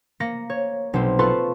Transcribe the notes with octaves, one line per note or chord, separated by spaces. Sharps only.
A#3 A#6 C#7
C#5
B1 C4
F4 A4 B4 A5 C6 C#6